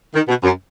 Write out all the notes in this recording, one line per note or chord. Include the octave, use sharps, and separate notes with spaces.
D#3
B2
F#2